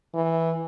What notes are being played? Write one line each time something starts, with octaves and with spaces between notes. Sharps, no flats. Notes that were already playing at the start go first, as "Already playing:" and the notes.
E3